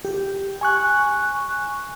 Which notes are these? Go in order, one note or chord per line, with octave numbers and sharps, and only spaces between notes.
G4
G#5 C#6 F#6